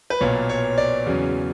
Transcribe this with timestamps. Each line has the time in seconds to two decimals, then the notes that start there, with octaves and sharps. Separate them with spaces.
0.10 B4
0.21 B1 A#2 A#3 C#5
0.49 C#5
0.78 D5
1.06 E2 C#3 F#3 C#4